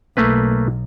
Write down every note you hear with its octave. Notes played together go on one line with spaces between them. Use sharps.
B1 A3 A#3 B4